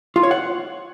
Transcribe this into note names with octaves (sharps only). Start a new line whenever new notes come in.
F4
C#5
F#5